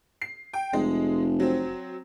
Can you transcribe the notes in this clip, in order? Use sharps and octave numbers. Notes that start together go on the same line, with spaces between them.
C7
G5
F1 G#3
F#3 C4